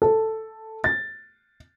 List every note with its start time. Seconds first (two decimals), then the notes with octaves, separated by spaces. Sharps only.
0.02 A4
0.84 A6